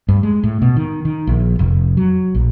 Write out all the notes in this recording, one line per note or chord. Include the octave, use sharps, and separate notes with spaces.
G2
G#3
A2
B2
D#3
D#3
A#1
F1
F#3
A#1